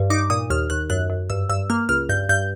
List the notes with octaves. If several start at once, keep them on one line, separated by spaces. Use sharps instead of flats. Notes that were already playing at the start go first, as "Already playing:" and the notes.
Already playing: G2
D#4 D6
A#2 D#6
D#2 F6
D#2 F#6
F#2 F#6
F#2
G2 E6
G2 E6
A#3 F6
C#2 F6
G2 G6
G2 G6